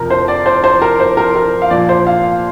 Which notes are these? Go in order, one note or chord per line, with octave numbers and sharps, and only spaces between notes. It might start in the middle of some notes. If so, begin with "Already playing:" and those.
Already playing: F2 C3 F3 A#4
C5
D5
C5
C5
A#4
C5
A#4
A#4
F5
A#2 F3 D5
C5
F5